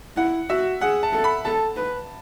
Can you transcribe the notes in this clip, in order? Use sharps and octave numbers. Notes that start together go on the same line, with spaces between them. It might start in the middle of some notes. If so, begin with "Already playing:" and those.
E4 F#5
F#4 E5
G#4 F#5
A5
A4
B5
A4 A5
B4